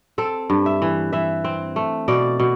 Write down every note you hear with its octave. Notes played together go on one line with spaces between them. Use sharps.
C4 A4
G2
E5
E3
E3 E5
C4
A3
B2 D5
B2